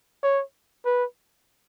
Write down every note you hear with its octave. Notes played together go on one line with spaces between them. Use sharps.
C#5
B4